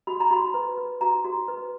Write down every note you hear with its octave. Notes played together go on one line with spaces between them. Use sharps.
F#4 B5
A#5
F#4 B5
B4
B4
F#4 A#5
F#4
B4